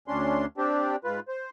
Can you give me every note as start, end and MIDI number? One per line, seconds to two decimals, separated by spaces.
0.08 0.46 38
0.08 0.46 61
0.08 0.46 62
0.08 0.46 84
0.58 0.96 60
0.58 0.96 62
0.58 0.96 67
1.04 1.20 44
1.04 1.20 65
1.04 1.20 71
1.28 1.50 72